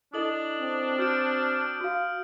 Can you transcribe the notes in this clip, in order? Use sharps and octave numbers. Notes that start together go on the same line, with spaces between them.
D4 E4 A4 D#5 D#6 F#7
C4
F#4 F6 G6 D7
F#4 F5